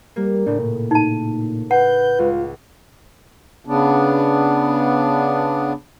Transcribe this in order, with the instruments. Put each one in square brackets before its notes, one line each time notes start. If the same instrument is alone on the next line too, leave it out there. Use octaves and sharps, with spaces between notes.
[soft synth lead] G3 [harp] A#3
[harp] A2 C#3 [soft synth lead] D4
[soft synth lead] A#2
[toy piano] D#4 A5
[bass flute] B4 [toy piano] F#5 [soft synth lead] G6
[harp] C#2 [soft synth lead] F4
[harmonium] C#3 B3 D4